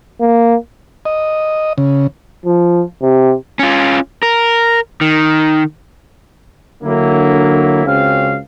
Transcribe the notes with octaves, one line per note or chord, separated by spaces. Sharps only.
A#3
D#5
C#3
F3
C3
C#4 F4
A#4
D#3
D3 F#3 A#3 E4
C#2 C#3 C4 C#4 F#4 F5